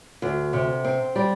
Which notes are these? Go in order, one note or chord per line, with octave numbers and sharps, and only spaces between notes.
D2
C3
C4
G3